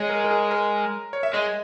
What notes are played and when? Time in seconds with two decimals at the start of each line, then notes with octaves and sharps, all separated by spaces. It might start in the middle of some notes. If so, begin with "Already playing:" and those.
Already playing: G#3 C#5
0.10 A#4
0.24 A#4
0.31 G#4
0.51 A#4
1.13 C#5
1.23 E5
1.34 G#3 D#5